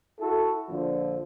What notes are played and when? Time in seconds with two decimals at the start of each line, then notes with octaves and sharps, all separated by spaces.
0.20 E4 F#4 A4
0.70 A#1 D3 F3